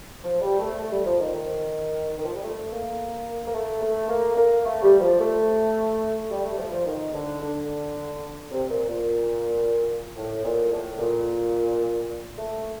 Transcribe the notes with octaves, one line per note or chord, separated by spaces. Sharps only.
F3
G3
A3
A3
G3
F3
D#3
D#3
D#3
F3
G3
A3
A#3
A#3
A3
A3
A#3
A#3
A3
G3
F3
A3
G3
A3
G3
F3
F3
D#3
D3
D3
C3
A#2
A#2
A2
A#2
A2
A#2
A3